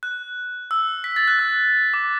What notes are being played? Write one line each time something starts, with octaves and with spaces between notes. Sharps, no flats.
F#6
E6
B6
A6
F#6
E6
D6